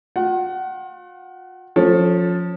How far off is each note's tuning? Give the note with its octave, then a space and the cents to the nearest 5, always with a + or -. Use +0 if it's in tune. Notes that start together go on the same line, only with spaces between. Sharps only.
F4 +45 F#5 +30
F3 +20 C#4 +0 A4 +0